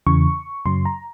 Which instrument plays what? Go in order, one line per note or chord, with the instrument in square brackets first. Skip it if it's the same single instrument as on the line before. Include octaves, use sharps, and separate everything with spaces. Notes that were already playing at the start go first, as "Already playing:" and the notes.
[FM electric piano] E2 C#3 E3 C#6
F#2 C#3 F#3 C6
A#5